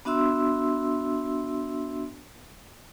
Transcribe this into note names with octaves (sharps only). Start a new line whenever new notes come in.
B3 D4 F#4 E5 C6 E6